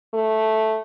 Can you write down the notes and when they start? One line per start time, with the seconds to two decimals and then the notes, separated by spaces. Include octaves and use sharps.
0.14 A3